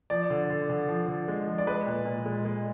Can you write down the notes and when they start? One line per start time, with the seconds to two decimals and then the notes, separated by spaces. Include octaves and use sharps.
0.10 F3 D5
0.30 D3
0.50 D3
0.69 D3
0.88 F3
1.08 D3
1.28 G#3
1.47 F3
1.58 D5
1.67 G#3 B4
1.86 A#2
2.05 A#2
2.26 G#3
2.45 G#3